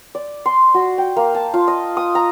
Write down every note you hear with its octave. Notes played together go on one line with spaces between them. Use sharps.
D5
C6
F#4
G5
A#3
A5
F4
D#5
D#6
A#5